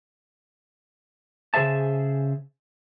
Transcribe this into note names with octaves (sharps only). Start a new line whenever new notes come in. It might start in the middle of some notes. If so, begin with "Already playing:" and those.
C#3 G#4 C5 E5 A5